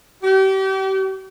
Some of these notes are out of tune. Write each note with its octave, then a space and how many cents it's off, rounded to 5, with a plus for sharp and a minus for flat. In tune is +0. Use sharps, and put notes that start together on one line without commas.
G4 -35